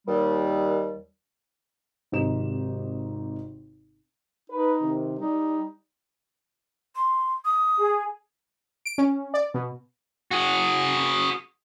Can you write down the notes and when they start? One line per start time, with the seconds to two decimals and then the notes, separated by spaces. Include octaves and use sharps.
0.07 D#2 G3
2.12 G#1 C3 D#4 G4 E7
4.50 D#4 B4
4.82 C3 D#3
5.19 G3 D#4
6.96 C6
7.45 D#6
7.79 G#4
8.85 D7
8.98 C#4
9.34 D5
9.54 B2
10.31 F#4 G#4